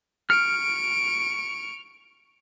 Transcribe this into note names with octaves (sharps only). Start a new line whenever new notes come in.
C#6 F6 D7